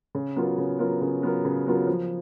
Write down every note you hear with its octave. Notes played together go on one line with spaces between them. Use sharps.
C#3
F#3 B3 F4 A#4
C#3
F#3 B3 F4 A#4
C#3
F#3 B3 F4 A#4
C#3
F#3 B3 F4 A#4
F3